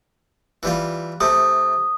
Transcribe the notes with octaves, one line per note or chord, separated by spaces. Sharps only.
E3 G3 F4
C3 A3 D#6